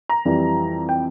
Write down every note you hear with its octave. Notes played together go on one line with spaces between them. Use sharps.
A#5
F2 E3 G3
G5